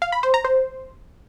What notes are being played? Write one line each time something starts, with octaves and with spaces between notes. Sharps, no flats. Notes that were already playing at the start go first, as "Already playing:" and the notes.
F5
B5
C5
A#5
C5